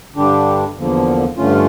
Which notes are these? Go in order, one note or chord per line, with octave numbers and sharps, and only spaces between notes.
G2 D3 G3 D4 G4
E2 D3 F3 A#3
G2 D3 A3 C#4 F4